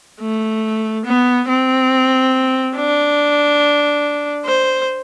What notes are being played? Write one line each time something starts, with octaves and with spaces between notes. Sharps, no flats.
A3
B3
C4
D4
C5